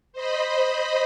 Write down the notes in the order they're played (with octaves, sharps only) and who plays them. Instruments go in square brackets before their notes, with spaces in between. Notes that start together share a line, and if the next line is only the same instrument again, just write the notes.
[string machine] C5 D#5 B5